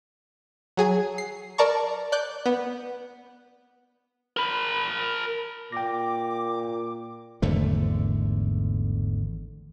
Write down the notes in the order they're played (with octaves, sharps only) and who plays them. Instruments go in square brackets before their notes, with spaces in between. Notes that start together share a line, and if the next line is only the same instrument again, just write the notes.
[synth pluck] F#3 G#4 G#5
C7
A#4 D5 A5 A#5 C#6
D5 F#6 G6
B3
[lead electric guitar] A#4 B5
[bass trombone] A#2 [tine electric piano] G5 A#6 [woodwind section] D6
[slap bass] G#1 E2 D3 A3